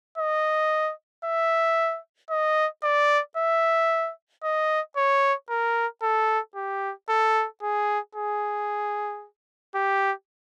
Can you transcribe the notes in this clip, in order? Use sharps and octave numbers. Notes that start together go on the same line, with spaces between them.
D#5
E5
D#5
D5
E5
D#5
C#5
A#4
A4
G4
A4
G#4
G#4
G4